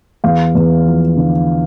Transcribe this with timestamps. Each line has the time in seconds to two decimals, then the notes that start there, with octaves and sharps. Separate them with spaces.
0.24 E2 F5
0.55 E2
0.86 F3
1.17 D3